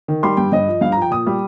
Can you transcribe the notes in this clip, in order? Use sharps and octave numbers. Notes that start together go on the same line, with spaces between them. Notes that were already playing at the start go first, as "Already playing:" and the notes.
D#3
G3 C6
G2 G5
G2 D#5
F3
G2 F5
F3 A#5
G5
A#2 D#6
G3